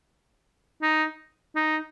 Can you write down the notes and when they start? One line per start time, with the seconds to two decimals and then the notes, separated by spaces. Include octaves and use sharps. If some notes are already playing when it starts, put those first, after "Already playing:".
0.82 D#4
1.55 D#4